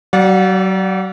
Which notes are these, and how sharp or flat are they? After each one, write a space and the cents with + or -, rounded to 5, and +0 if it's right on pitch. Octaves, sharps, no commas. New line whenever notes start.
F#3 +35 D5 -10 F#5 -40